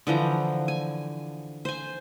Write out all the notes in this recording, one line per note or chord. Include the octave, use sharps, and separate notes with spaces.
D3 E3 F3 A#5
G#5
C5 G#5